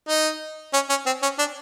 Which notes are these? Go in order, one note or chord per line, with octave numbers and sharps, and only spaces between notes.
D#4
C#4
C#4
C4
C#4
D4